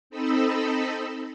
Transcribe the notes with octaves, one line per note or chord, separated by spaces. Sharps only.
C4 D#4 A4 D#5 B5 E6